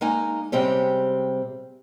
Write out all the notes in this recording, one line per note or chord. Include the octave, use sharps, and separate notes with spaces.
G#3 A#3 D#4 G#5
C3 G3 G#3 C4 C#4